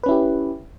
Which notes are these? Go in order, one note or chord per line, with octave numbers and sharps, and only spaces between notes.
C#4 E4 G4 B4